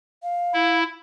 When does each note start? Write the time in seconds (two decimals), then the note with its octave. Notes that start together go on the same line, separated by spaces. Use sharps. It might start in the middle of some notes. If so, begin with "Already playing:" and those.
0.23 F5
0.54 E4